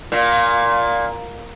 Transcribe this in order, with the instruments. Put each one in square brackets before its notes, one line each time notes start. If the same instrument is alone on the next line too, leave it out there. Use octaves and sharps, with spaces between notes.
[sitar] A#2